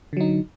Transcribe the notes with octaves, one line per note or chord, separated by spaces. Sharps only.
D3 F#3 D#4